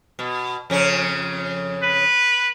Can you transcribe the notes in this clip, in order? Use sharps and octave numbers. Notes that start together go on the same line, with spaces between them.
B2
F2 C#3 C#4
B4